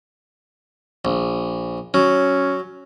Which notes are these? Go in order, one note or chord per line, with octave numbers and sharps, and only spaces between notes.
A#1
F#3 C#4